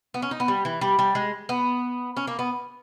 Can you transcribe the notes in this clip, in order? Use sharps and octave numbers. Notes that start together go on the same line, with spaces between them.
B3
C#4
D#4
B3
G3
E3
G3
G3
G#3
B3
C#4
A#3
B3